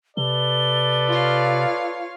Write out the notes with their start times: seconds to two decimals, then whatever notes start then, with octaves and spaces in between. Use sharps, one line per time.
0.17 C3 A4 B4 D5 G7
1.09 F4 C#5 F5